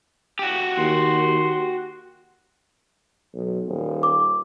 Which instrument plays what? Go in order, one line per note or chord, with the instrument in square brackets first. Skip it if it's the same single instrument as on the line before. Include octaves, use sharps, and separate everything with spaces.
[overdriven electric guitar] F#4 G4
[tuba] D#2 [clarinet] C6
[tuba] B1
D#1
[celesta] D6